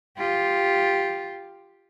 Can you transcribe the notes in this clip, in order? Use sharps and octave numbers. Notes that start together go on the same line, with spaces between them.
F4 G4